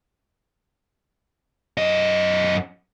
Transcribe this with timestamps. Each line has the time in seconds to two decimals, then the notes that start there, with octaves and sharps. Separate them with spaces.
1.78 F#2 D#5